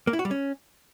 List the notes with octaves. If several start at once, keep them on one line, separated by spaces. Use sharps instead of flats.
A#3
E4
F#4
G3
C#4